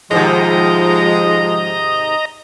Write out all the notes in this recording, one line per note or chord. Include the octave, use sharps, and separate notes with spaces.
G#2 C3 D#3 F3 G#3 D#5 A#5